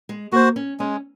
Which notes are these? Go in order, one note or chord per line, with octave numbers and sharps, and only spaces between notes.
G#3
A#3 F#4 C5
C#4
G#3 C#4